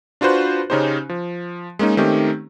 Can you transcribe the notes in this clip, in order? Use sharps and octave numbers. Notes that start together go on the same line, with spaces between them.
D4 F4 F#4 B4 C5 F#6
C#3 C#4 D#4 G4 C5
F3
G#3 A#3 C#4 D#4
D#3 A3 C4 C#4 D#4 G4